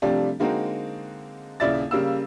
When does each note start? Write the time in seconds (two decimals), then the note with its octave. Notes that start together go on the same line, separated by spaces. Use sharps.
0.02 C3 F3 G3 A3 D4 G4
0.40 D3 G#3 A#3 C4 D#4 F#4
1.60 D#1 C#3 E4 D5 E5 A6
1.91 C#3 G3 A#3 E6